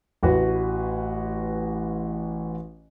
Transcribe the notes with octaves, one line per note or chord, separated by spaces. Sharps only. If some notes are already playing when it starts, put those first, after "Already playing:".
A1 F#4 B4